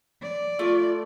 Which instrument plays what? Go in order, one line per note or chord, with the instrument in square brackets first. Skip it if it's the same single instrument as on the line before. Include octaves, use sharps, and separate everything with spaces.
[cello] D5
[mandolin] A3 [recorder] F4